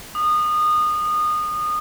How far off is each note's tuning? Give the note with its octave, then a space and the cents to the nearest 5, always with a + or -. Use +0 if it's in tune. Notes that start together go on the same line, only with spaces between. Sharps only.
D#6 -25